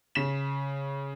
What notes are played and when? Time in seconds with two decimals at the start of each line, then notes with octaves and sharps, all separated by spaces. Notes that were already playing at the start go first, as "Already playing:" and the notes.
0.15 C#3 B6 E7